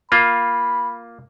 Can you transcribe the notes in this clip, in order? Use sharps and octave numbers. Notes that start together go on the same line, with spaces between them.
A#3 F4 B5